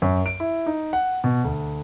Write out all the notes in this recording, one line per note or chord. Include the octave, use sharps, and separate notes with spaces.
F#2
D7
E4
D#4
F#5
B2
D2